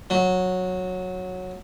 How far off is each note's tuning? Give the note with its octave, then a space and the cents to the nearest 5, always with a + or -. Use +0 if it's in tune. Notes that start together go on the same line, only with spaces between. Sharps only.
F#3 -10